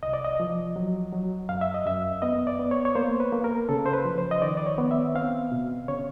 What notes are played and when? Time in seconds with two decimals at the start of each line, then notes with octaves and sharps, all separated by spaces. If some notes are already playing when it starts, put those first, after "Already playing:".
0.03 C2 D#5
0.13 D5
0.25 D#5
0.40 F3
0.76 F#3
1.13 F#3
1.49 F#2 F5
1.61 E5
1.74 D#5
1.86 F#2 E5
2.22 B3 D#5
2.47 D5
2.59 B3
2.71 C#5
2.85 C#5
2.95 A#3 C5
3.20 B4
3.32 A#3
3.44 A#4
3.69 C#3 A4
3.86 C5
3.93 B4
4.05 F3
4.18 C5
4.31 D#5
4.42 D#3 D5
4.57 D5
4.66 C#5
4.78 B3
4.91 E5
5.15 C4 F5
5.52 B2
5.88 C#3 C#5